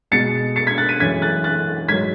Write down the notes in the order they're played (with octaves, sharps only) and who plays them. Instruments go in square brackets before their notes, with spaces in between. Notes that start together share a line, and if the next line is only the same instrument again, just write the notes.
[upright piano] B2 G#3 A6 C#7
A6 C#7
G#6 B6
F#6 A6
B6 D#7
F#2 E3 G#3 G#6 B6
F#6 A6
F#6 A6
G#2 F#3 G#6 B6